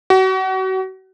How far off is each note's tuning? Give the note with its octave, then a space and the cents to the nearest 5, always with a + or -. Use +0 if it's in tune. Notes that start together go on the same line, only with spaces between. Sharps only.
F#4 +35